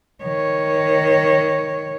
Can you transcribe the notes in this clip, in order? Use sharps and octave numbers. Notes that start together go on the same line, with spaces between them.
D#3 C#5